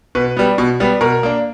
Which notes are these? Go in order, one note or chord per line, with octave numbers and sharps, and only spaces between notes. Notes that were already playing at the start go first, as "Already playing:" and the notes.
B2 B4
G3 B3
B2
G3 B3
B2 A#4
A#3 D4